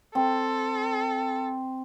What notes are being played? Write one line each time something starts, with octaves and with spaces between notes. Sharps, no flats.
C4 A4